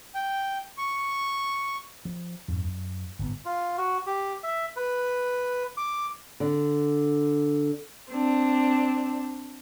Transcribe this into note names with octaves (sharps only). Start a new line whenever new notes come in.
G5
C#6
F3
F2 G#2
F#2
G1 A2 B3
F4
F#4
G4
E5
B4
D6
D3
C4 D4